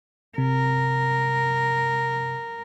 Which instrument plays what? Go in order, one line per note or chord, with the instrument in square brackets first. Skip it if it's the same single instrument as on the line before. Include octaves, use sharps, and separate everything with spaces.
[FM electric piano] C3 [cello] A#4